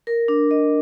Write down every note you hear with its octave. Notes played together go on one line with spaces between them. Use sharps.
A#4
D4
D#5